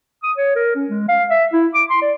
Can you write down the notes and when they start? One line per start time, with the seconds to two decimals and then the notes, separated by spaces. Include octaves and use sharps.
0.23 D#6
0.37 C#5
0.56 A#4
0.76 C#4
0.90 G#3
1.09 F5
1.30 E5
1.53 E4
1.75 D6
1.90 C6
2.02 D5